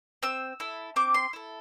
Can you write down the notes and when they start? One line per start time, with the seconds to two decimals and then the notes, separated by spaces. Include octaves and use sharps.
0.23 C4 E6
0.60 E4 A4
0.96 C4 D6
1.14 C6
1.33 E4 A4